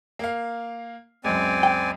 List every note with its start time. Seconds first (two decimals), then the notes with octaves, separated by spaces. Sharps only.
0.19 A#3 F5
1.24 C#2 F#2 C4 D5 G#5
1.63 G5